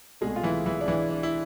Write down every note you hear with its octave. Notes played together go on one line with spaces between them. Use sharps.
C2 B2 G#3 A3 G#4
F4
E3 E4
E3 E4
D4
E3 E4
D4
E4